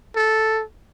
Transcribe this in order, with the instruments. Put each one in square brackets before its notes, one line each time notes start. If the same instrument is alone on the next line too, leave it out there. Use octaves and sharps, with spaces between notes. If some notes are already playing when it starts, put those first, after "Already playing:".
[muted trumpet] A4